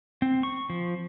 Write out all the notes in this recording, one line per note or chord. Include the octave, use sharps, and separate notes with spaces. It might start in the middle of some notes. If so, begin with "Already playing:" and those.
C4
C#6
F3